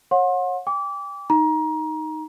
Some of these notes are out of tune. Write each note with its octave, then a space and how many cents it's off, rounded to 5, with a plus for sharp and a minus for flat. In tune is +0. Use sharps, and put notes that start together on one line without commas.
C#5 -25 F#5 -35 C6 +35
G5 +35 D6 -25
D#4 +0 A#5 +25